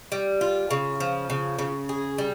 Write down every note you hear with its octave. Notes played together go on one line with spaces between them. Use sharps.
G3
F4
C#3
F3
C#3
C#3
G#4
G3